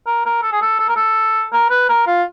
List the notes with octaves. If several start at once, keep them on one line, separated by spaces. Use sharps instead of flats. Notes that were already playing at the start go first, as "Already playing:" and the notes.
A#4
A#4
A4
G#4
A4
A4
A#4
A4
A#4
B4
A#4
F4